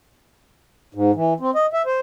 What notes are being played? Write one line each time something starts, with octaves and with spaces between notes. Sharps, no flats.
G#2
E3
C4
D#5
E5
C5